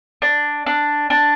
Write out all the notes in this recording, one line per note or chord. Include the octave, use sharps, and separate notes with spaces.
D4
D4
D4